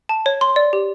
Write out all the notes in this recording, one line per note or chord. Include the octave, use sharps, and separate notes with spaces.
A5
C#5
C6
D5
G4